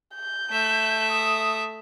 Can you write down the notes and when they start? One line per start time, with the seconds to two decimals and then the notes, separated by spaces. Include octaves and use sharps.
0.15 G6
0.50 A3 E5
1.11 D#6